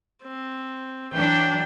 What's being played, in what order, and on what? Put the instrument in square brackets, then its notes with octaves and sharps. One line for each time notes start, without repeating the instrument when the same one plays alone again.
[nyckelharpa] C4
[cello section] E3 F#3 D4 [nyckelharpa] G5